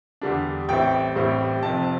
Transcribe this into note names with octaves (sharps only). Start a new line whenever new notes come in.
E2 D3 G3 D4
A1 A2 G3 C4 E4 G5
A1 A2 G3 C4 E4
F1 F2 C3 A5